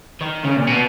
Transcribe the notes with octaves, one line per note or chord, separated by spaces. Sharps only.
D#3
C#3
A#2
B2